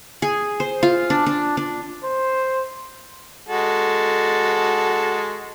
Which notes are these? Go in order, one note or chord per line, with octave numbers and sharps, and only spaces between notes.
G#4
C5
F4
D4
D4
D4
C5
G#3 F#4 A4